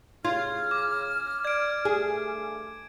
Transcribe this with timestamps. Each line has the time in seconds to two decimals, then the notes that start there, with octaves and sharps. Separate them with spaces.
0.25 C#3 F4 G#4 C#5 F6 G#6
0.71 D6
1.45 D5 G#6 D7
1.85 G2 A3 G#4